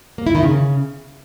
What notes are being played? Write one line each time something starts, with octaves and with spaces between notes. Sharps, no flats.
A#3
E4
D#3
C#3